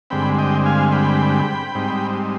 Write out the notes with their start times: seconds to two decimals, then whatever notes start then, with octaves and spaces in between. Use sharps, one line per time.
0.10 G2 D3 G#3 C4 G5 B5
0.38 D#5 G5
0.66 F5 G#5
0.92 G5 B5
1.75 G#2 G3 C4 D#4